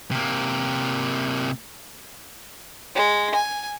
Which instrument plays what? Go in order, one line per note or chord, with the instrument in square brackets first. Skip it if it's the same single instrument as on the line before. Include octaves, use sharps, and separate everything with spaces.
[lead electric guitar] C3 A#3
[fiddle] G#3
G#5